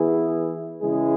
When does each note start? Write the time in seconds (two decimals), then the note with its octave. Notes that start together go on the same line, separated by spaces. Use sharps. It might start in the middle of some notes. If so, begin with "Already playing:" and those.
Already playing: E3 B3 E4 G#4
0.82 C#3 E3 G#3 E4 G#4